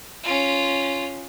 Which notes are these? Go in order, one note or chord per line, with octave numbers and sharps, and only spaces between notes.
C#4 F4